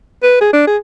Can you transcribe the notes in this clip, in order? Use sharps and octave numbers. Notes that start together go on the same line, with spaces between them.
B4
G#4
D4
G#4